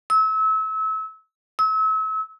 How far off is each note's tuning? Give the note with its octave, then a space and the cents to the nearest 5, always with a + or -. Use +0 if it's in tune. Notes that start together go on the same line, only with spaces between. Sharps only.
E6 -30
E6 -35